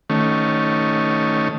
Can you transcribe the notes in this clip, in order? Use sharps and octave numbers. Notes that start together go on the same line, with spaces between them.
D#3 A3 C#4